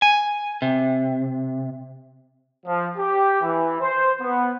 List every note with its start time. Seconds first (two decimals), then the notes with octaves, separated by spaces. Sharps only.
0.02 G#5
0.62 C3
2.66 F3
2.97 G4
3.42 E3
3.81 C5
4.21 B3